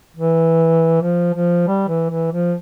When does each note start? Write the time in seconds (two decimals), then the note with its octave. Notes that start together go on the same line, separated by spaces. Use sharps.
0.16 E3
1.02 F3
1.34 F3
1.67 G3
1.88 E3
2.10 E3
2.32 F3